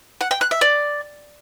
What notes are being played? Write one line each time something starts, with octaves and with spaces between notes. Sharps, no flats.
F#5
G5
F#6
E5
D5